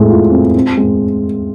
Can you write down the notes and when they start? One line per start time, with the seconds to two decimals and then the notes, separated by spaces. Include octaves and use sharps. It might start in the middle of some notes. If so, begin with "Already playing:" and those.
Already playing: A2 G#3 C4 G#4
0.09 F4
0.31 C4
0.55 C4
0.77 G#3